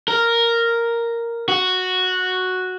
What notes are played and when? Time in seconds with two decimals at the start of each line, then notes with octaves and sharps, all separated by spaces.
0.08 A#4
1.48 F#4